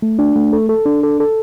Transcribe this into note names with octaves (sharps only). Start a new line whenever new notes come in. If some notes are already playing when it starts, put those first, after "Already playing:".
A3
D4
A3
A4
A4
D4
A4
A4